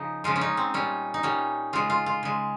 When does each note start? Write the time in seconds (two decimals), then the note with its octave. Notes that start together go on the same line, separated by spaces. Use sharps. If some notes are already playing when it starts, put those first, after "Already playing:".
Already playing: C#3 F3 D#4
0.24 C#3 F3 G#3 F4
0.36 C#4
0.41 D#4
0.57 C4
0.74 A#2 G3 C#4
1.14 D#4
1.23 A#2 G3 C#4
1.73 C#3 G#3 F4
1.90 F4
2.06 F4
2.23 C#3 G#3